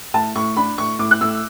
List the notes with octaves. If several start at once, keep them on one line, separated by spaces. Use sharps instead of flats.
A2 A5
A2 C#6
D4 B5
A2 C#6
A2 D6
F#6
A2 E6